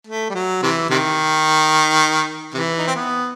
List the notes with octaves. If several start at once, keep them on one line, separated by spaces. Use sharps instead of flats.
A3
G3
F#3
C3 E3
C3 D#3
C3 E3
D#4
C4
B3